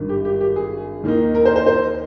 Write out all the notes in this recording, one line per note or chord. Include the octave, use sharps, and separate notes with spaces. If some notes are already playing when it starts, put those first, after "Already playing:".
Already playing: G#1 G2 D#3
G4
G4
G4
G#4
D#2 D#3 A#3 D#4
A#4
C5
C5
C5